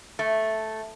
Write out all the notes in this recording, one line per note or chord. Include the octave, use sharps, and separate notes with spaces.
A3